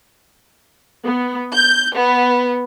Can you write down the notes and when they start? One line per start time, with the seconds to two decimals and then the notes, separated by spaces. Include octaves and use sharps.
1.03 B3
1.54 G6
1.96 B3